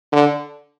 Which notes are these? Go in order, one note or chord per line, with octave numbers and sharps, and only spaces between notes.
D3